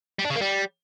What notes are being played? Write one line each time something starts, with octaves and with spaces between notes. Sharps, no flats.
G3
D4
C#3
A#3
G3